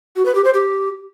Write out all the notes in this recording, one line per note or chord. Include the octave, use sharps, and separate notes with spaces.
F#4
B4
G4
C5
G4